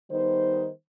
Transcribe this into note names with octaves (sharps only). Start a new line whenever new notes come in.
D#3 G3 B3 D#4 C5